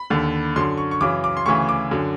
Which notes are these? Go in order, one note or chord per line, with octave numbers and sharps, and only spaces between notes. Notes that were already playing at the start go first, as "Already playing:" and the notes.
Already playing: B5
D#2 D3
F#2 D3 C6
C#6
C#6
F#2 C#3 E3 D6
D6
C6
D2 C#3 E3 C#6
D6
F#2 D3